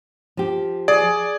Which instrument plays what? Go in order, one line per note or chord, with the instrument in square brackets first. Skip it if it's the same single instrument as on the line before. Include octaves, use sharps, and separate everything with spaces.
[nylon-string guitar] F3 G4
[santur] G#4 [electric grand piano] D5